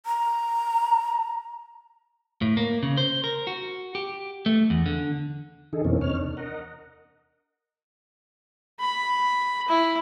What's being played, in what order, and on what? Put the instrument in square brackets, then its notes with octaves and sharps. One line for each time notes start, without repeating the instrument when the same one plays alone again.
[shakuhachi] A#5
[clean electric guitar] A2
A#3
C#3
C5
A#4
F#4
G4
A3
E2
D3
[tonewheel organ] D3 D#3 D#4 G#4 A4
F2 B2 E3 A#3 C4 C#4
E2 C3 D#4 C#5 F6
D4
A#4 D#5 F#5
[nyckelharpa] B5
E4